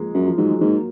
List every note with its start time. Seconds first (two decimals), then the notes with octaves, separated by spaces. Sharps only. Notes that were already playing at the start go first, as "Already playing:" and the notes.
Already playing: F3 G#3 A#3
0.14 F#2
0.28 F3
0.38 G#2 F#3
0.50 G#3
0.61 G#2 F#3 A#3